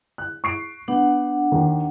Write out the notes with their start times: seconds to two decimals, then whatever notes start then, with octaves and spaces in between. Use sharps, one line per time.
0.18 F#6
0.44 C#6 C7 D7
0.88 B3 D4 F#5
1.52 D#2 D#3